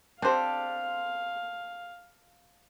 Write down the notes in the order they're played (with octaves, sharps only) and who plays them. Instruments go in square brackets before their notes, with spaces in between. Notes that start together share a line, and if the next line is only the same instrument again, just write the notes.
[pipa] C4 C5 [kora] D4 G4 A4 [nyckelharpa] F5